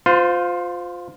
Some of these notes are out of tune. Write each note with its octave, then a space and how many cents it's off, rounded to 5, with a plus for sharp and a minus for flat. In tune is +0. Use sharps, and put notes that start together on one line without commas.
F4 +15 C5 -20